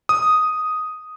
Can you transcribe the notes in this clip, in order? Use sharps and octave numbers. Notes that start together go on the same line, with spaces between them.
D#6